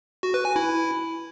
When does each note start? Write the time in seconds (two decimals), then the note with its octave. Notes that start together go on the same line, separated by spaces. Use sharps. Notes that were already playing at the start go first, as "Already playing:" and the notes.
0.23 F#4
0.34 B4
0.45 G#5
0.56 E4